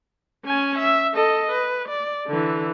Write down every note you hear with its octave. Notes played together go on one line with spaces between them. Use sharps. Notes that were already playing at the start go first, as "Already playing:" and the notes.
C#4 G#5
E5
A4 D#5
B4
D5
D3 E3